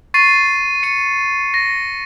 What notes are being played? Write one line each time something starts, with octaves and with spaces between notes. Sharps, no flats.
C#6 A6 C7 D#7
C#7 D#7
A#6